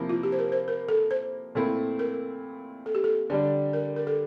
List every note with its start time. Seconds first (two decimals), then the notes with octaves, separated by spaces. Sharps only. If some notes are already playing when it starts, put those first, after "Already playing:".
Already playing: C3 F3 A#3 E4
0.09 F4
0.23 G4
0.32 C5
0.39 A#4
0.52 C5
0.68 A#4
0.89 A4
1.11 C5
1.55 A#2 A3 C4 E4
1.99 A#4
2.86 A4
2.95 G4
3.04 A4
3.30 D3 G3 D4
3.73 A#4
3.96 A#4
4.07 A4